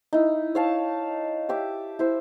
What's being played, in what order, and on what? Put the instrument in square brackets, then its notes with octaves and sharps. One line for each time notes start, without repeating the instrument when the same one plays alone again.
[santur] D#4 E4
C#5 F5 A5
G4 E5 D6
E4 C5